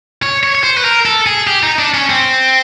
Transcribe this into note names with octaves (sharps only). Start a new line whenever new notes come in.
C#5
C#5
C#5
C5
B4
A#4
A4
G#4
G4
D#4
D4
C#4
C4